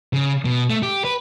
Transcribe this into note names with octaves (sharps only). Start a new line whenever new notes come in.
C#3
B2
A3
G4
B4